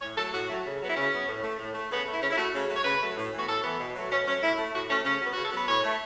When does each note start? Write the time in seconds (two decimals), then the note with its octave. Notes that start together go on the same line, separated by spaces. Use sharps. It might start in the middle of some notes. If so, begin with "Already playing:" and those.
0.01 A2 C#5
0.17 F#3 A3 A4
0.33 A2 F#4
0.49 F#3 A3
0.65 C#3
0.81 F#3 B3
0.88 E4
0.95 C#3 C#4
1.11 F#3 B3
1.27 A2
1.43 A3
1.59 A2
1.74 A3
1.90 C#3 B3
2.07 A3
2.13 E4
2.21 C#3 C#4
2.31 E4
2.37 A3 F#4
2.54 C#3
2.70 F#3 A3
2.76 C#5
2.84 C#3 B4
3.01 F#3 A3
3.16 A2
3.32 E3 B3 F#4
3.47 A2 A4
3.64 E3 B3
3.79 B2
3.94 F#3 A3
4.10 B2 C#4
4.26 F#3 A3 C#4
4.43 A2 E4
4.58 A3
4.74 A2 F#4
4.89 A3 C#4
5.05 C#3 C#4
5.21 F#3 B3
5.32 C#3 F#4
5.44 A4
5.52 F#3 B3 B4
5.68 A2 C#5
5.84 A3